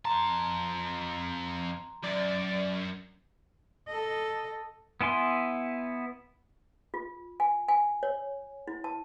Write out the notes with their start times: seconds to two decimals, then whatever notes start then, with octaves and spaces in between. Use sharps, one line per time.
0.05 F2 A5 A#5 C6
2.04 F#2 D5
3.88 A4 D#5
5.01 B3 E4 G#5 C6
6.94 F4
7.40 G#5
7.68 G#5
8.03 C#5
8.67 E4
8.84 A5